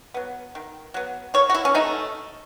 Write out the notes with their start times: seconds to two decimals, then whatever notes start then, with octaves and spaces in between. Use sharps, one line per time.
0.14 F#3 B3
0.55 D#3
0.94 F#3 B3
1.34 D#3 C#5
1.50 F#4
1.55 E4
1.65 C#4
1.74 F#3 A3 D#4